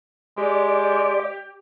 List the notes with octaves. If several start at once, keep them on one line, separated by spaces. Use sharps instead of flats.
G#3 G4 D5